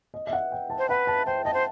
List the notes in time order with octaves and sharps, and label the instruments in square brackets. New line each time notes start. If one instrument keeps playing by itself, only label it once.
[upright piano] D#5
E5
F#5
G5
A5
[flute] C5
[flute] B4 [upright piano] F#5
[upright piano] A5
[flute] C5 [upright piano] G5
[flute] D#5 [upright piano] A5
[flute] C5